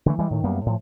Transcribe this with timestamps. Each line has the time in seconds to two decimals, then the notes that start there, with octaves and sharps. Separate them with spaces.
0.06 D3 E3 A3
0.18 E3 G3 G#3
0.31 A2 D#3
0.44 F#2 G3 A#3 B3
0.66 A2 F3